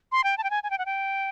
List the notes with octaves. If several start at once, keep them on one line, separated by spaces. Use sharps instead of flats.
C6
G5
A5
G5
G#5
G#5
G5
F#5
G5